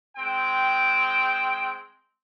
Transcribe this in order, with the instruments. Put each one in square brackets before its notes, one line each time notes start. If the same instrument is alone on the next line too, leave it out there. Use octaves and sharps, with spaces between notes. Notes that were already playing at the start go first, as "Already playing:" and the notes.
[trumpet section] G#3 C4 G5